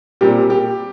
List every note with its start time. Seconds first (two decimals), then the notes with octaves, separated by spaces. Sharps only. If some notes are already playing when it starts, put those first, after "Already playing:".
0.21 A#2 G3 C4 G4
0.50 G4